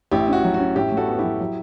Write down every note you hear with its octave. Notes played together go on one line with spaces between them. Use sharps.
A1 E4 G4
C#4 F#4
F#3
F#4
C#4
A2 E4 G4
A2
F#4 A4
B3
F#3 E4 G4
F#3